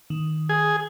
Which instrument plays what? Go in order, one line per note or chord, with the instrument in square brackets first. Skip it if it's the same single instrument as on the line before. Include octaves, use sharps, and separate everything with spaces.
[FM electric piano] D#3
[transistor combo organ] G#4